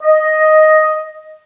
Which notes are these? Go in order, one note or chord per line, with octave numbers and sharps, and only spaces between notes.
D#5